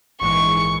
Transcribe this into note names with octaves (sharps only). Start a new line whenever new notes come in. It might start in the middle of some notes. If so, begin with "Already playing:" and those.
A#1 G#2 E3 G#3 C#6